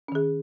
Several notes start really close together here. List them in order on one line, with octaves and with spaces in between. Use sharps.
C#4 D#3 G#4